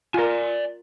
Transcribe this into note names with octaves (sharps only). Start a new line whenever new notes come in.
F4 A#4 D5 G#5